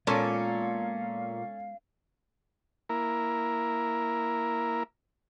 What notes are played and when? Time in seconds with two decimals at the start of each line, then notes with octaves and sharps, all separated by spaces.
0.07 A#2 G#3 B3 C#4 A4 C#5 F5
2.89 A#3 E4 A#4